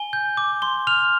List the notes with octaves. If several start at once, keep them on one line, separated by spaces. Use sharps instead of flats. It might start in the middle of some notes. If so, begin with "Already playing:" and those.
Already playing: G#5 G7
G6
D6
C6 G7
F6 F7